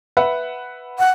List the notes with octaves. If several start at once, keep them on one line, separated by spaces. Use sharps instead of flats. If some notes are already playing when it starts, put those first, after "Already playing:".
B4 E5 F#5
F#5